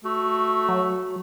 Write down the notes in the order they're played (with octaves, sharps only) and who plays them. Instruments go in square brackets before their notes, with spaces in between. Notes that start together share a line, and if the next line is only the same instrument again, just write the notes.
[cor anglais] A3 [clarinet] F#4
[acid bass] F#3